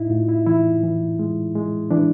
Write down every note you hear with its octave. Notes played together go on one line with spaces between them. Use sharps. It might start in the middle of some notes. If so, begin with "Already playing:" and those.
Already playing: A2 D#4 E4
A2 F4
E4
E3 E4
E3
G#3
G#3
E3 D4